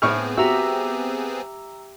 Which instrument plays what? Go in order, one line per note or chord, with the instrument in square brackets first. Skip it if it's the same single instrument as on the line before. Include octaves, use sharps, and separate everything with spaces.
[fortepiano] A2 C#6 F6 [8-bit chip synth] B3 C4 G#4
[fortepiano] F#4 [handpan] G4 E5 [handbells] A#5 E6